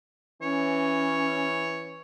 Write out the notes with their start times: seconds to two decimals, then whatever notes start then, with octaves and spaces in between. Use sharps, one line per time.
0.42 E3 C#4 C#5